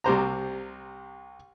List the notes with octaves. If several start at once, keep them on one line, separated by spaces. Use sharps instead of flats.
C2 C3 C5 A#5